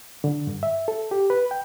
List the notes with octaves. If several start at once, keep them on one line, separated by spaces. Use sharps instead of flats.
D3
G2
E5
A4
G4
B4
G5